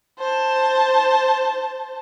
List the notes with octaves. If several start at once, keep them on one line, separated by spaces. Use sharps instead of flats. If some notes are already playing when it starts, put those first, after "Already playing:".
C5 A5